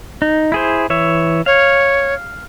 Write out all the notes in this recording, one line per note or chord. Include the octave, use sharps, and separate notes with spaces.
D#4
E4 G#4 C5
E3 C#5 E5
C#5 F5